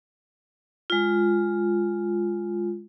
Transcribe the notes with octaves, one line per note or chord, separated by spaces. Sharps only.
G#3 F4